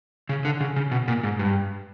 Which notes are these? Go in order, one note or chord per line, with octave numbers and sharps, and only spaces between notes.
C#3
D3
C#3
C#3
B2
A#2
G#2
G2